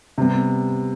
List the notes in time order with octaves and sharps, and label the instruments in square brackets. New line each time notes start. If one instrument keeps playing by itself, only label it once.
[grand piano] C3 G3 B3